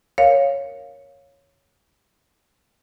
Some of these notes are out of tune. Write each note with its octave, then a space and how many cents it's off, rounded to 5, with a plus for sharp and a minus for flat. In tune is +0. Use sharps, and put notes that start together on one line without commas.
A#4 +5 C#5 +0 F5 +0